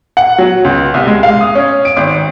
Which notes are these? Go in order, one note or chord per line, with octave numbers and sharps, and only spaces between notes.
F#5
F#3
C#2
C2
G#3
F5
D#6
C#4
D7
G#1